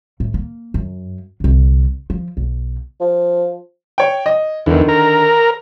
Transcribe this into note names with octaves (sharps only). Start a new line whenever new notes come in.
A2
A#3
F#2
C2 D3
F3
B1
F3
C#5 G5
D#5
E2 D3 D#3
A#4